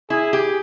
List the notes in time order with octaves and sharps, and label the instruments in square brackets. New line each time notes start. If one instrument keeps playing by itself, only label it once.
[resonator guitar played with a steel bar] E4 [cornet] G#4
[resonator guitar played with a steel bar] G4